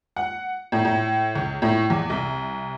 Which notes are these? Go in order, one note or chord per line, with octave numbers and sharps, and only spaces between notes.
F#5
A2
A2
C#2
A2
E2
C2